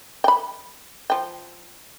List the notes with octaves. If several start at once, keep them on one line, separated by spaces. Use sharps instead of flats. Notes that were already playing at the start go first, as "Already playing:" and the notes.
G5 B5
F3 G5